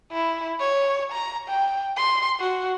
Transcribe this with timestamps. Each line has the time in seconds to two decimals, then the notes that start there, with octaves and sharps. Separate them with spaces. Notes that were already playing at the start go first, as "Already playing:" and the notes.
0.12 E4
0.60 C#5
1.12 A#5
1.49 G5
1.97 C6
2.40 F#4